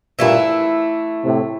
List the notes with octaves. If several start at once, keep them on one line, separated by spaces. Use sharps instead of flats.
G2 A#2 E3 A3 E4
A2 C3